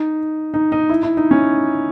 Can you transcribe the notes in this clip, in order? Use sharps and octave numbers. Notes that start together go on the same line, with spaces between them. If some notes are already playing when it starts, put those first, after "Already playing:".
Already playing: D#4
D#4
D#4
E4
E4
D#4
C#4